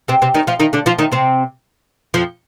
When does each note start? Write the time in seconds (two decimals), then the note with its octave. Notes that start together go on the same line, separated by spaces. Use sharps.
0.08 C3 C4
0.22 C3 C4
0.34 D#3 D#4
0.47 F3 F4
0.60 D#3 D#4
0.73 D3 D4
0.86 F3 F4
0.98 D#3 D#4
1.12 C3 C4
2.14 F2 F3